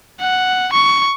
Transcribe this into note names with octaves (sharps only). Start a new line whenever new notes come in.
F#5
C#6